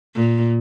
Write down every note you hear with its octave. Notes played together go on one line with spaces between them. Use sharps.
A#2